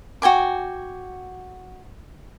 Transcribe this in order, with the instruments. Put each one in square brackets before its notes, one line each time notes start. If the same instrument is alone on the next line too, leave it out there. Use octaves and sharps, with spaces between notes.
[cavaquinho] F#4 G5 G#5 D6